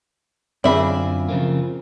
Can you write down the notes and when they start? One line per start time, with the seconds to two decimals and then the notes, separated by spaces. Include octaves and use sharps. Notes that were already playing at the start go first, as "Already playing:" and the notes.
0.64 F#2 D3 C4 F4 G#4 D5 E5 B5
1.29 C#3 F3 A#3